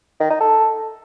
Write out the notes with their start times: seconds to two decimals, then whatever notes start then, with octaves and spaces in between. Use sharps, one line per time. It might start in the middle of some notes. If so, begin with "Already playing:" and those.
0.20 D#3
0.30 D#4
0.40 A4